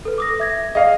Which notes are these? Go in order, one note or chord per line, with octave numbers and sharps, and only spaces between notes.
A4 B4
D6 D#6 A#6
E5 G#6 A#6
G#4 D5 D#5 F5